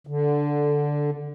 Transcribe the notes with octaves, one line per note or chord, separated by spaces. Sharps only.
D3